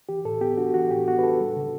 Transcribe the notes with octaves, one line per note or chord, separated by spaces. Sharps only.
E3 G4
A2 A4
B3 G4
D4 F#4
E3 F#4
A2 G4
B3 F#4
B4
D4 A4
G3
C#3